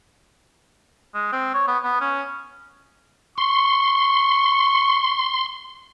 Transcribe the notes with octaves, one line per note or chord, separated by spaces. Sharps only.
G#3
C4
C#5
B3
B3
C#4
C6 C#6